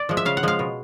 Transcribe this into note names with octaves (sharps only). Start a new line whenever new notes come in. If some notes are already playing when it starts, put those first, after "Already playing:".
Already playing: D5
F3 G#3
E5
C#3 F5
F#5
F3 G#3 F5
B2